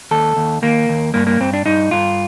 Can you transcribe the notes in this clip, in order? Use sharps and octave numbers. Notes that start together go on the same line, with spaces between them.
D#2 A4
D#2
D#2 A#3
D#2
G2 A#3
A#3
G2 C4
D4
G2 D#4
G2 F4